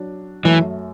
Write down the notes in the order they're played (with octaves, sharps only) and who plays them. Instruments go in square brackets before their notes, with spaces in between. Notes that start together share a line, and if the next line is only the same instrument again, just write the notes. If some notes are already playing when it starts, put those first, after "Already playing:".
Already playing: [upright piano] F#3 D4
[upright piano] F#2 F#3 A3 [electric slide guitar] E3